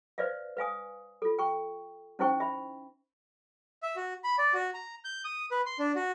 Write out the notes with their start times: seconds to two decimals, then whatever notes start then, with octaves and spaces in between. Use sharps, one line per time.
0.18 B4 C5 D5 E5 F5
0.57 B4 F5 G#5 D#6
1.22 F4 A4
1.39 G5 C#6
2.19 C#4 D#4 E4 C5 G5 C#6
2.40 E5 B5
3.83 E5
3.96 F#4
4.24 B5
4.38 D5
4.54 F#4
4.74 A#5
5.04 G6
5.25 D#6
5.51 B4
5.66 C6
5.79 D4
5.96 F#4